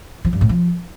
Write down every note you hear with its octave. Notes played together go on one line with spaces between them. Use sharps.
F3
G2
A2
F3